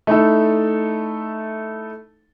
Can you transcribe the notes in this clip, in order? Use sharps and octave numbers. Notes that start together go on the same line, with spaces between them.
A3 D#4 E4 A4